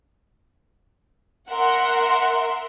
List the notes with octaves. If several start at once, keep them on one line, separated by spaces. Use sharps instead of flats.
A#4 E5 F#5 C6